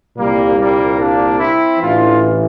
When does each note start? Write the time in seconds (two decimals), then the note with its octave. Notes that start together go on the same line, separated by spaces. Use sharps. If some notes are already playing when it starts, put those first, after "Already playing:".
0.17 C2 A#2 G3 A#3
0.59 G3 A#3
0.98 A#3 D4
1.39 C4 E4
1.80 A1 A2 E3 D4 F4